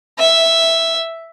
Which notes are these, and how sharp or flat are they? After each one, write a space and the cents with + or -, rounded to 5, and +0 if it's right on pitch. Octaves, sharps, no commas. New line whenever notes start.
E5 +0